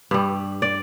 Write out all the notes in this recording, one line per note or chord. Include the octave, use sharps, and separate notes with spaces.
G2 G3
D5